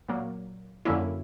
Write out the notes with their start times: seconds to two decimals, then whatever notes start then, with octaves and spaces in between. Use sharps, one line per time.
0.09 A#2 F#3 A#3
0.85 F#2 D3 A#3 C#4 E4